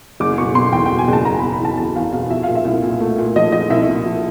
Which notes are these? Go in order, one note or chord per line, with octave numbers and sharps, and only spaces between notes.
F#1 D6
B2 C#6
B2 C6
E2 G5
G5
B2
G#5
F#1 A5
F#1 A#5
B2 B5
B5
E2
A5
E2 A5
E2 F5
B2 F5
F3 E5
A#2 F5
E5
C2
A#2
A3
A#2
F3 D#5
F3 D#5
C2 E5
A#2
F3